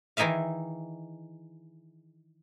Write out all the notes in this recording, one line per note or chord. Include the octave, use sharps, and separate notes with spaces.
D#3 E3 D#4 G#4 E5 F5